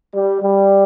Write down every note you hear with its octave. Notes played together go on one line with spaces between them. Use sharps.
G3
G3